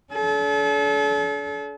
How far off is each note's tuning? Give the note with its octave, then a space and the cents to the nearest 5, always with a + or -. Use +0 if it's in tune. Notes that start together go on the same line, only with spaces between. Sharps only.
D4 -40 A4 -40